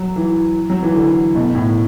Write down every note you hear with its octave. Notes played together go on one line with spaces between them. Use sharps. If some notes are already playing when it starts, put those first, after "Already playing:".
Already playing: F#3
E3
F#3
E3
D3
B2
A2